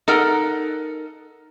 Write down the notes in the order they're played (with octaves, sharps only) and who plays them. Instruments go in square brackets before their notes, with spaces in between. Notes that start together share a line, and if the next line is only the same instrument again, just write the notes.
[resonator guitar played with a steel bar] D#4 A4 A#4 F#5